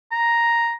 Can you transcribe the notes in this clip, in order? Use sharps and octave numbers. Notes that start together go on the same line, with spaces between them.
A#5